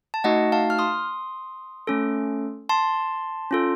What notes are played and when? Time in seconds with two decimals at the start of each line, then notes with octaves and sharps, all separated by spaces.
0.14 A5
0.24 A3 D#4 F#4 D#5 F#5
0.52 F5 A5
0.70 F6
0.79 C6 D#6
1.87 A3 C#4 A4
2.69 A5 C6
3.51 C#4 F4 A4